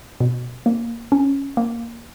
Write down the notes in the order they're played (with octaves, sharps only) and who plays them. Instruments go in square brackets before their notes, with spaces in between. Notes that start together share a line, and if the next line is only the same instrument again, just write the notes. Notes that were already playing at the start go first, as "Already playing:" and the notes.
[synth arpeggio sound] B2
A#3
C#4
A#3